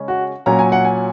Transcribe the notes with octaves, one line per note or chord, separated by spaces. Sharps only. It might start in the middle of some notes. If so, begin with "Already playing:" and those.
Already playing: C#3 G#3 C#4
F#4
A#2 F#3 C#4 A#5
G#5
F#5
G#5